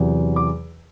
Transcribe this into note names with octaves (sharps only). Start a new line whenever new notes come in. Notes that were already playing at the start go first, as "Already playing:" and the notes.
Already playing: E2 C3 F#3
D6